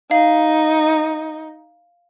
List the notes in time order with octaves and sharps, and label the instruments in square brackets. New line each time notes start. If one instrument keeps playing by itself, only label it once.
[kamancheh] D#4 [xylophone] F5